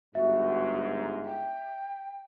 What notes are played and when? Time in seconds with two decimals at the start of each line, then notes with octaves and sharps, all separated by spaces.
0.15 G1 G#2 F#4 E5
1.25 G5